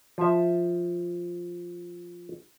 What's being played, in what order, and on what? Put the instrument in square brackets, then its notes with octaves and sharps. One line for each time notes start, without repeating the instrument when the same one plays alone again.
[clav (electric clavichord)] F3 F4 E5